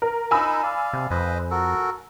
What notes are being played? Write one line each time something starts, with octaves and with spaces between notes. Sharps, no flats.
A#4
D#4 A#4 D#5 G#5 B5 E6
D5 F5
C3
F2 B4 C5 D#5
F#4 A4 A#4